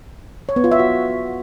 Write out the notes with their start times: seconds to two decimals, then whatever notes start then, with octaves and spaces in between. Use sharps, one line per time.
0.49 C#5
0.56 B3
0.64 F4
0.72 E5
0.79 F#4